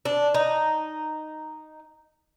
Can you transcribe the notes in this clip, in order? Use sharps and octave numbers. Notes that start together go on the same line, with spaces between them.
D4
D#4